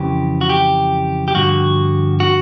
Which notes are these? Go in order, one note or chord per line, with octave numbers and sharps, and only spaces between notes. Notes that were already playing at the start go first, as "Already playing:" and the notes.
Already playing: F2 C#3 E3 G4
F#4
G4
G4
G2 D3 F3 F#4
F#4